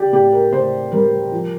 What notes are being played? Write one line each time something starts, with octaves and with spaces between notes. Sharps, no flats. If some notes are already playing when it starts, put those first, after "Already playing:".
Already playing: G4 D5
A2 G4
A#4
A2 C5
G3 A#4
F3